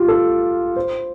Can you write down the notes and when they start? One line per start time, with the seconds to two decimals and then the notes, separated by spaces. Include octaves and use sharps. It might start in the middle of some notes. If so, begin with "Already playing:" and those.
Already playing: F4 G4
0.08 A4
0.76 C5